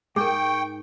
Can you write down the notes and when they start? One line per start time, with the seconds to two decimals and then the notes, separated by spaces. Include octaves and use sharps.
0.16 G#2 G#4 A#4 G5 C#6